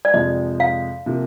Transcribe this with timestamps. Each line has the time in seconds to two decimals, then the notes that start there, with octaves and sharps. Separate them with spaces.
0.05 D5
0.14 F2 C3 F3 G#3 D#5
0.60 F5
1.06 C3 F3 A#3